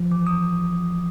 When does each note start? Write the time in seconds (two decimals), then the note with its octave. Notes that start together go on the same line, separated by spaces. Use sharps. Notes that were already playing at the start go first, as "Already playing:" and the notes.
Already playing: F3
0.11 E3 D6
0.27 D#6